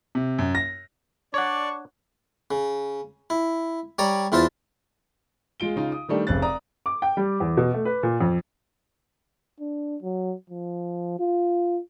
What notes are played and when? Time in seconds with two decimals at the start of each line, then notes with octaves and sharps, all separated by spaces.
0.15 C3
0.39 F#2
0.55 A#6
1.34 D4 C#5 D5 F#5 C#6
2.51 C#3
3.30 E4
3.99 G3 C#5 D5 A#5
4.32 E2 E4 F4 C5 A5
5.60 G#3 F4 D7 G7
5.76 C#3 D#4 F4
5.92 D#6
6.08 D#3 G3 A3 D4 D#4
6.27 F1 C#3 C5 F#6 A6
6.42 D5 A#5 D#6
6.86 D6
7.02 G5
7.17 G3
7.40 E2
7.57 B2
7.74 A3
7.85 B4
8.03 A#2
8.21 F2
9.60 D4
10.02 F#3
10.50 F3
11.20 F4